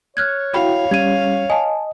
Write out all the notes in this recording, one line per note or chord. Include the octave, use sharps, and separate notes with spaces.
C#5 F6 F#6 G#6
E4 F#4 F5 G5 B5
G3 C#4 G#6 D#7
D#5 G#5 A5